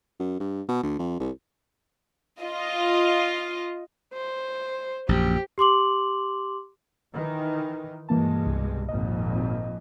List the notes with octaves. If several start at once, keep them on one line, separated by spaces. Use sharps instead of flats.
F#2
G2
B2
D2
F2
C2
F4 D#5
C5
A#1 F#2 G4
G4 C6 D6 F#7
D#3 E3
G2 B2 E3 G#3 A#3 A5
C2
G#1 F2 A#2 D#5